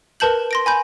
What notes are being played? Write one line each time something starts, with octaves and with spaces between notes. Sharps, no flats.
A#4 B4 A5 G6 F#7
C6 A#6 D7
G#5 B5 G6